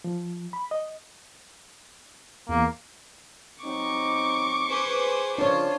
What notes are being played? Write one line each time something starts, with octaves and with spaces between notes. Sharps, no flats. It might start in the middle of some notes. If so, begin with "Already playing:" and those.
F3
B5
D#5
E2 A#3
F#3 C4 D#4 C#6 D6
G#4 B4 C5
C2 C#3 F3 D4 F4 C5 C#5